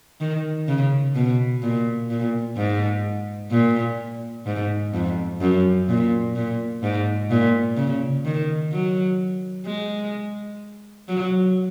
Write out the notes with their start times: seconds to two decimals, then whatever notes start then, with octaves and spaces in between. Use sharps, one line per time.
0.21 D#3
0.68 C#3
1.15 B2
1.62 A#2
2.09 A#2
2.57 G#2
3.51 A#2
4.46 G#2
4.94 F2
5.41 F#2
5.89 A#2
6.35 A#2
6.83 G#2
7.30 A#2
7.77 C#3
8.25 D#3
8.72 F#3
9.66 G#3
11.08 F#3